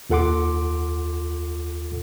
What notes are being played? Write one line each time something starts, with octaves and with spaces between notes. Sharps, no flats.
D#2 F4 A4 F#5 C6 D6